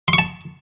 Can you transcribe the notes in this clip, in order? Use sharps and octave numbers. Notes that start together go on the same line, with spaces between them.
C6
C#6
A5